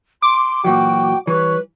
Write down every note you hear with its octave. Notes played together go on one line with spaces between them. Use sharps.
C6 D6
A#2 E3 F#3 F#4 G5
E3 G3 B4 C#5